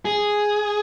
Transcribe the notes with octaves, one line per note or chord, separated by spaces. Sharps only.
G#4